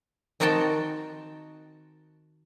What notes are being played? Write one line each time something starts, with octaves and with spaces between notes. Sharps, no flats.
D#3 C4 D#4 F#4 G5 A5